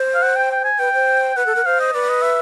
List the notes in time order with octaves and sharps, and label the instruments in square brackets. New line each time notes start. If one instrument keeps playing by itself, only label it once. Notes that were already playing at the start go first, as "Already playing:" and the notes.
Already playing: [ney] C5
[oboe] F5
F#5
G5
G5
G#5
[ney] B4 [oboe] G5
[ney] C5
[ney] B4 [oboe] F#5
[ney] A4
A#4
[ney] C5 [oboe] F5
[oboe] D#5
[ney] B4 [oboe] D5
[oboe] D#5
E5